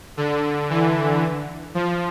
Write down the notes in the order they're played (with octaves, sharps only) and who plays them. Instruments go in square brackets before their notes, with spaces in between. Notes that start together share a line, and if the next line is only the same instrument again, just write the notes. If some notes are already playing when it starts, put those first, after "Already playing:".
[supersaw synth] D3
E3
F3